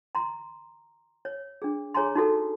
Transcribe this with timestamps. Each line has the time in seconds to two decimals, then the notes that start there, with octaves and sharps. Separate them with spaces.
0.15 A#5 C6
1.25 C#5
1.62 D4 G#4
1.94 G#4 C#5 G#5 A#5 C6
2.15 D#4 F#4 A4 A#4